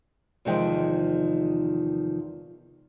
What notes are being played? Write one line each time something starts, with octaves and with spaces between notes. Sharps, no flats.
E2 C3 D#3 F3 G#3 G5